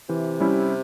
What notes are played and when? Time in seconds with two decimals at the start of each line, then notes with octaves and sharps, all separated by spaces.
0.09 C3 E3
0.40 G3 C#4 E4